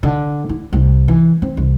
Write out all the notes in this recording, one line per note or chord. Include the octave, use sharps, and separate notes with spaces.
D3
E4
C2
E3
C4
C2